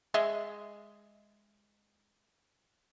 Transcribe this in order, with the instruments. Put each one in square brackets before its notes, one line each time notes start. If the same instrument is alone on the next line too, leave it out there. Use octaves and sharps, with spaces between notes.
[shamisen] G#3 D#5 E5